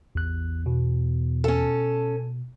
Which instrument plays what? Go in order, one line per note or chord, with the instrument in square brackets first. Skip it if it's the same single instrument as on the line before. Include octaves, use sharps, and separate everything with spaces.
[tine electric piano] A1 F#6 [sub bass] E2
[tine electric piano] B2
[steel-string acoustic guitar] C#4 A4